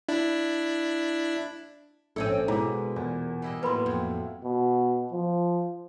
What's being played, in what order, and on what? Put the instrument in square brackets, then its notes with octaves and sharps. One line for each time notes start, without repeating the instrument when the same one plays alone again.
[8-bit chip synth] D4 E4
[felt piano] A#1 D#7 [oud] C4 C#4 A4
[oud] B2 [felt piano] G#3 [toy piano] E4 D6 [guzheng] B4
[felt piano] E2 [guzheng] A#2
[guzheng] G3 E4 D#5
[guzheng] A2 F#3 [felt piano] A#3 B3 [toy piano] B4 B5 C6
[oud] F2
[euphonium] B2
F3